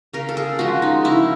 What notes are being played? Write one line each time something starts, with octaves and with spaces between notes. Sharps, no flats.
C#3 A#4
A4
G#4
F3 G#3 C#4 F#4
D#4
C#3 E4